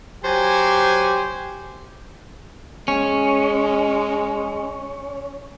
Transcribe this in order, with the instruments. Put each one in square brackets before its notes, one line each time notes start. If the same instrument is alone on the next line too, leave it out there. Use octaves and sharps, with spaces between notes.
[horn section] F#3 G4 C5 G#5
[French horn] G#3 [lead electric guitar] C#4